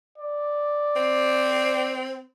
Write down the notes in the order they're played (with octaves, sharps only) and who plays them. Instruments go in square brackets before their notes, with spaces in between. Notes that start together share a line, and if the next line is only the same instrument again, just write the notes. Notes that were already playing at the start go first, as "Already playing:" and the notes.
[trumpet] D5
[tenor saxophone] C4